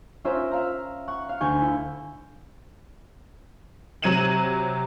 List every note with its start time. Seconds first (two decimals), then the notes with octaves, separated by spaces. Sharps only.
0.25 C#4 F4 A#4 C5 E5
0.51 E5 F5 A#5
1.08 F#5 C#6
1.29 F5
1.41 D2 G#5 C#6 G6
1.62 E4
4.02 C3 F#3 G#6 D#7 E7 F#7